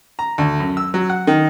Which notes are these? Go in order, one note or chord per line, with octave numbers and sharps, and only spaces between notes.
A#5
D2
F#2
E6
F#3
F#5
D#3